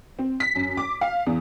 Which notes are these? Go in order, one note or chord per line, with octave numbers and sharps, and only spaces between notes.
C4
B6
F#2
D6
F5
E2